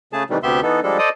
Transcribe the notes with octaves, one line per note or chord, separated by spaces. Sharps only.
C#3 A3 G#4 A5
C3 D#3 E3 G3 A3
D2 C3 B3 G4 E5 C6
E3 B3 D#4 A4
F3 G3 G#3 D4 A4
A4 C5 D5 D#5 D#6